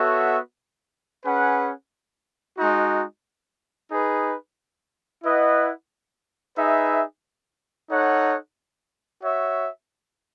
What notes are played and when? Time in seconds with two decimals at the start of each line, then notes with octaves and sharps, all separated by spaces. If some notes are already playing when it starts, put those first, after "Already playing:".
Already playing: B3 F#4 A4 C#5 E5
1.25 C#4 G#4 B4 F#5
2.57 G#3 D#4 F#4
3.90 D#4 G#4 B4
5.23 E4 B4 D#5 F#5
6.56 D#4 G#4 B4 E5
7.89 D#4 A4 C#5 F#5
9.22 F#4 C#5 E5